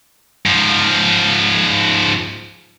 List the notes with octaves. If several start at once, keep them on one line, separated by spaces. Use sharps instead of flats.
G#2 F3